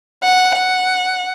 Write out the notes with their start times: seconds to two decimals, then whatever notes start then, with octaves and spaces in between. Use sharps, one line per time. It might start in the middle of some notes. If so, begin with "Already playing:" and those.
0.24 F#5
0.57 F#5